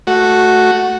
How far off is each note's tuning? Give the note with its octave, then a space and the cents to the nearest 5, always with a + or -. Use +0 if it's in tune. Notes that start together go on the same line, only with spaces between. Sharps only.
A3 +0 F#4 +0